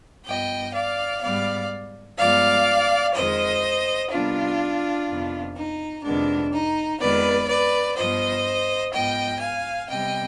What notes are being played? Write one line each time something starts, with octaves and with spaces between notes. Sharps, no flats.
G2 F3 B3 D#5 G5
D5 F5
G#2 G3 B3 D5 F5
G2 F3 G#3 B3 D5 F5
F2 D#3 G#3 C5 D#5
C3 D#3 G3 B3 D4 F4
F2 C3 D#3 B3
D#4
F2 C3 D#3 G#3 B3 D4
D#4
F2 D#3 G#3 B3 B4 D5
B4 D5
G2 F3 B3 C5 D#5
G#2 F3 B3 D#5 G5
F5 G#5
C3 G3 B3 D#5 G5